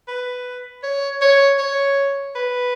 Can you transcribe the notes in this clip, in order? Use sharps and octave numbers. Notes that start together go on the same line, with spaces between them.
B4
C#5
C#5
C#5
B4